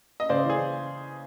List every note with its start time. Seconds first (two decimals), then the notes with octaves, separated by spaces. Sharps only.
0.20 D#5
0.29 C#3 C5 D5
0.45 E3 G#4